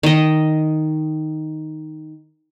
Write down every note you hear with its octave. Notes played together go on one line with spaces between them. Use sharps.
D#3 D#5